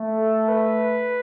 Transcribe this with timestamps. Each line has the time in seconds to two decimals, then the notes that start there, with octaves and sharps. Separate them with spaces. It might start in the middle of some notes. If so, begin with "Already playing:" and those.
Already playing: A3
0.17 A4
0.48 B4